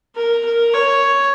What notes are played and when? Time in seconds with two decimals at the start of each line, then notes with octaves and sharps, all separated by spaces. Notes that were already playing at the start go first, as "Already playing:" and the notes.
0.16 A#4
0.45 A#4
0.74 C#5